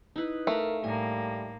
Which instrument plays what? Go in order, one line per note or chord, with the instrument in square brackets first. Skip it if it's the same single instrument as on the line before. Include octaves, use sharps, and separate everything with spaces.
[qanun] D#4 E4 B4
[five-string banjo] A3 [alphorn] A#4 [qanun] F5 A#5 B5
[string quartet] A2 A#3 [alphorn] G3 [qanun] G#5